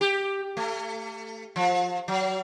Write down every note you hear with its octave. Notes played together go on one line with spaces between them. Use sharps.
G4
A3
F3
F#3